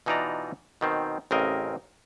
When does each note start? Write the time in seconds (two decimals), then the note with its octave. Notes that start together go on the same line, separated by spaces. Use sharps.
0.06 B2 E3 D#4 F4 D5 A#5
0.81 B2 D#3 C4
1.31 A1 C#3 C4 A#4 D#5